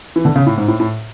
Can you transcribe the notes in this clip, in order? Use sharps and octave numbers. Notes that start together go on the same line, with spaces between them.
E3
D3
C#3
A2
G#2
A2
A2